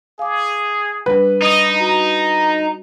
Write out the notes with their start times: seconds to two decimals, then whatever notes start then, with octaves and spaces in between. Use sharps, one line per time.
0.19 G#4 F5 D6
1.06 G3 D4 B4
1.42 D#4 D#5
1.80 F#4 A#5